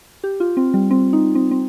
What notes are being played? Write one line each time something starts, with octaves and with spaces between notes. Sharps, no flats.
G4
F4
C4
G3
C4
D#4
C4
C4